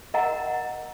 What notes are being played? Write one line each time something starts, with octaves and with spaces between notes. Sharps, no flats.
A#4 D#5 F#5 A#5